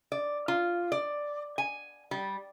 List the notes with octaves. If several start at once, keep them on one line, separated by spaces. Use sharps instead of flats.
D5
F4
D5
G#5
G3